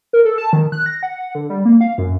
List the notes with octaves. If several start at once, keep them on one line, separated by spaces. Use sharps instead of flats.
A#4
A4
A5
D#3
F#6
A#6
F#5
D3
G3
A#3
F5
F#2